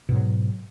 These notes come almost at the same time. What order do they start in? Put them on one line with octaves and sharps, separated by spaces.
B2 G#2 F#3